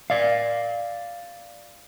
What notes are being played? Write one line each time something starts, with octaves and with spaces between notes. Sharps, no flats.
D5 F5